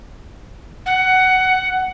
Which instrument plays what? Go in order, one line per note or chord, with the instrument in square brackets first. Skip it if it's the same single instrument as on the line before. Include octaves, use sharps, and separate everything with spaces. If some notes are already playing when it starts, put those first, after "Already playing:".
[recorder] F#5